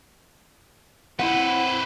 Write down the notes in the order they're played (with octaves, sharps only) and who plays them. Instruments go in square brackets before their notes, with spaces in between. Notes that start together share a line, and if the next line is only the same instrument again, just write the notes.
[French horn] C4 [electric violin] E4 [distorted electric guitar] B4 C5 [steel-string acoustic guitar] F#5